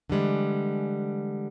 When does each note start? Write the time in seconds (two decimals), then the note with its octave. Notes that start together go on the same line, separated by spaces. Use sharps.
0.10 D3 E3 G3 G#3